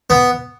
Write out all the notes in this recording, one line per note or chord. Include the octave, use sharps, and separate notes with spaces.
B3